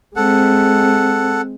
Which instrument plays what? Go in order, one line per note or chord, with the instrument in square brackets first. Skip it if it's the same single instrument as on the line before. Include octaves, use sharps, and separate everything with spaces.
[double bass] G#3 C4 [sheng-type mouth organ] A4 F#5